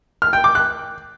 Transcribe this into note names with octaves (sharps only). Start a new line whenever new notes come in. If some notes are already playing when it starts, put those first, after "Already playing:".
F6
G5
D6
F#6